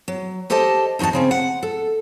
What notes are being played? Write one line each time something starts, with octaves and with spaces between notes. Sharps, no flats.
F#3
G4 A4 C5 D5 D#5 A5
E2 D#4 F#4 D#5 A5
C#3 C4 C#4
F#5
A4